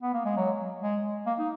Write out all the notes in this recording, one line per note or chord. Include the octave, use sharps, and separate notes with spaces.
B3
A#3
G#3
F#3
G#3
A#3
D#4